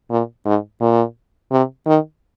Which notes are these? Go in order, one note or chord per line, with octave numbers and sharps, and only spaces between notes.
A#2
G#2
A#2
C3
D#3